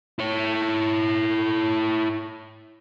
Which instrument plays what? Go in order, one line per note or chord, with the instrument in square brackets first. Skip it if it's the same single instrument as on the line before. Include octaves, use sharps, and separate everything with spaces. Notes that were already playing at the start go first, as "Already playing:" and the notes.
[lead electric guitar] E4 C#5